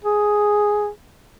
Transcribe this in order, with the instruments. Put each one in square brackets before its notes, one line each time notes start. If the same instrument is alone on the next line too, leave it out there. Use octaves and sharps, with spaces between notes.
[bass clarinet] G#4